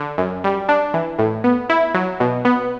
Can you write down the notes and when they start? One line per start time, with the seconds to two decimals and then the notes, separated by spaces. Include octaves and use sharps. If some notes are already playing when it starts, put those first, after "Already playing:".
Already playing: D3
0.18 F#2
0.44 G3
0.69 D4
0.94 E3
1.19 A2
1.44 B3
1.69 E4
1.94 F#3
2.20 B2
2.45 B3